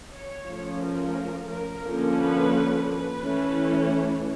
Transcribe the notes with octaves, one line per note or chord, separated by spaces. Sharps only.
C#5
F3 A3 C#4
A#4
A#4
D3 F3 A#3 C#4
B4
B4
E3 A3 C#4